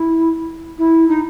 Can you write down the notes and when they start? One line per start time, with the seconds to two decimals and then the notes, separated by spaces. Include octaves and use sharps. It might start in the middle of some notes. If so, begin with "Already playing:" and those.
Already playing: E4
0.78 E4
1.08 D#4